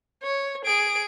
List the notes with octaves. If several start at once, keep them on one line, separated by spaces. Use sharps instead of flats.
C#5
G#4 D7